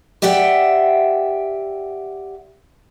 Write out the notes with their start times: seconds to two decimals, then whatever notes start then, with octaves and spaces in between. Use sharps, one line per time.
0.22 G4 D5 E5 F#5 G5